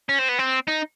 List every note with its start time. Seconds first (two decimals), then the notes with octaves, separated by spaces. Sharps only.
0.09 C#4
0.19 C4
0.29 B3
0.39 C4
0.67 D#4